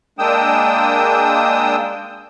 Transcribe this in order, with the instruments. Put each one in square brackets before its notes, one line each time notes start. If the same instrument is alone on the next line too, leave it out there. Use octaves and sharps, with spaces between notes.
[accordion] G#3 A#3 D4 G5 D#6 E6